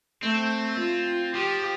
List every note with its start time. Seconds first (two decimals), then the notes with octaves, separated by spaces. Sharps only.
0.23 A3 C4
0.80 F4
1.35 F3 G4